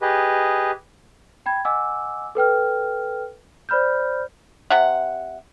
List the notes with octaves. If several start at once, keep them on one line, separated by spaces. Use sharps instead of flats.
G4 G#4 B4 D#5
G5 B5 G#6
D#5 F#5 G#5 D6 E6
A4 B4 G5 F6
C5 D5 B5 F6 G6
C3 F#5